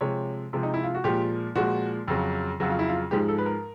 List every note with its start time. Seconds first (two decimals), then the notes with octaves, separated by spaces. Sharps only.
0.01 C3 F3 G#3 C#5
0.53 C3 F3 G#3
0.63 D#4
0.74 E4
0.83 F4
0.95 F#4
1.04 A#2 F3 G#3 G4
1.55 A#2 F3 G#3 F#4
2.08 F2 C#3 F#3
2.60 F2 C#3 F#3 F#4
2.70 F4
2.79 E4
2.89 F4
3.11 G#2 F3 G#3 G4
3.28 A4
3.38 B4
3.46 A#4